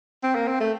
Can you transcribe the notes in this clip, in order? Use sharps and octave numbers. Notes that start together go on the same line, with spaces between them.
C4
A#3
C4
A3